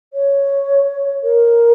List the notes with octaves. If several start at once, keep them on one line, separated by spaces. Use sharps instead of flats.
C#5
A#4